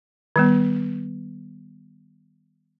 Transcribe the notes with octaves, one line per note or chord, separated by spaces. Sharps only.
D#3 G3 B3